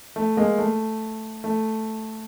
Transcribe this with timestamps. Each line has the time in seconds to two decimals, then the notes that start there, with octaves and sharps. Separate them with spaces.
0.16 A3
0.37 G#3 A#3
0.58 A3
1.44 A3